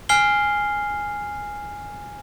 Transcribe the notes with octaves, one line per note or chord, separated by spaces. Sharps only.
G#5 F6 C7 G7